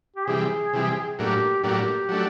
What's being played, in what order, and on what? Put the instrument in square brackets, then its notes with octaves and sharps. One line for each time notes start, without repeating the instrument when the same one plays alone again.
[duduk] G4
[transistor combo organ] C3 E3 G3 [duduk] G#4
[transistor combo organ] C3 E3 G3
[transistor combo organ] A2 F#3 A#3 D4 [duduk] G4
[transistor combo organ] A2 F#3 A#3 D4 [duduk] G4
[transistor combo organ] F#3 A3 D4